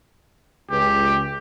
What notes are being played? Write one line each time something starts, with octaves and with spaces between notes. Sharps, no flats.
C#2 G4